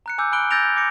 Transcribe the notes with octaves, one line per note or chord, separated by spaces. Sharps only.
A#5 F#6 C#7
G#5 D6 E6 G6
G#5 B5 F6 F#6 D7 G7
E6 G6 A6 A#6 D7 F7
G6
D6 G6 A#6 C#7